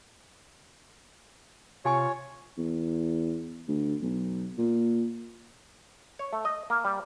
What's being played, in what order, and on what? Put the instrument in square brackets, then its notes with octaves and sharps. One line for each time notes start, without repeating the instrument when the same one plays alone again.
[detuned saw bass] C3 [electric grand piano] F4 C#6 [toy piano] G4 G#5 [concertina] C#5
[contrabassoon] E2
D2
B1
A#2
[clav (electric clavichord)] C#5
A3
D#5
A#3
G3